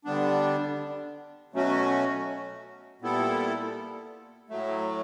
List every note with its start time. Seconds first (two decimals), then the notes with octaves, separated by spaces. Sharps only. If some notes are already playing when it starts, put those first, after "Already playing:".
0.05 D3 G3 B3 D4
1.53 B2 F#3 A3 C#4 F#4
3.01 A#2 G3 B3 E4 A4
4.49 A2 F#3 A3